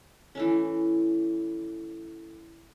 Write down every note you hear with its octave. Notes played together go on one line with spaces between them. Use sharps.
E3 A3 C#4